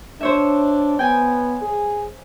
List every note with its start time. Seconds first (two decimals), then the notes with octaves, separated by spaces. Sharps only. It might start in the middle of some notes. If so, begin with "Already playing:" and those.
0.21 D4 C5 C#5 E5
0.99 B3 G5 G#5
1.62 G#4